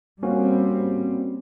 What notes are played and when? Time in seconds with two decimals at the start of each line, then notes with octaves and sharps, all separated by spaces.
0.23 G3 A#3 C4 C#4 F#4